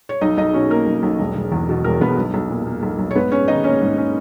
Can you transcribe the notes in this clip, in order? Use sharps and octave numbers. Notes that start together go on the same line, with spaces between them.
C#5
B1 D#4 D#5
B1 D#4 D#5
B2 C#4 C#5
A#3 A#4
B1
B1
E1
E1
E2
B2
E1 A#4
E1 B3 B4
B1
B1
A#2
A#3
B1
B1
C#5
G#2 B3 B4
C#4 C#5
D#3 D#4 D#5
A#3 C#4 C#5
G#2
C#4